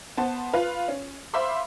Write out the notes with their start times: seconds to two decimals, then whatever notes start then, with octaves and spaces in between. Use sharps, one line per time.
0.17 B3 C5 A5
0.53 F4 B4
0.88 C#4
1.33 C5 E5 F5 B5 C6 D6